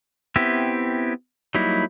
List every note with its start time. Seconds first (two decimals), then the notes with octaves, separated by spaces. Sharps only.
0.36 B3 C4 E4 G4 E5
1.55 F#3 G3 A#3 D#4 E4